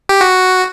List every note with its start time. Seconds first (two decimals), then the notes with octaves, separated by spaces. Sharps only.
0.09 G4
0.21 F#4